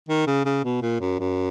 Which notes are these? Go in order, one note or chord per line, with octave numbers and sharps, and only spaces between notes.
D#3
C#3
C#3
B2
A#2
F#2
F#2